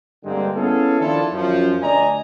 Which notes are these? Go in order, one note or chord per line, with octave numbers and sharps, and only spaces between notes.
G2 D3 G3 G#3 A#3 C4
B3 C#4 E4 G#4 A4 F5
D#3 F3 D4 E4 F4 A4
F#2 F3
D2 D4 D5 D#5 G#5 A#5